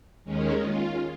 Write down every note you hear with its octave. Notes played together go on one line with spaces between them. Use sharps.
D#2 D#3 G#3 C#4
F4